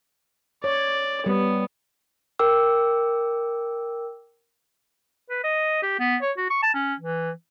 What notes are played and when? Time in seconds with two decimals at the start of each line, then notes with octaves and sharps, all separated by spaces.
0.64 C#5 D5
1.26 G3 B3
2.39 A#4 G5 D6 E6
5.30 B4
5.44 D#5
5.83 G4
6.00 B3
6.22 C#5
6.37 F#4
6.50 C#6
6.63 A5
6.75 C#4
7.00 E3